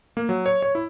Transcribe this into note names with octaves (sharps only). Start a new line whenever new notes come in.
A#3
F#3
C#5
C#5
E4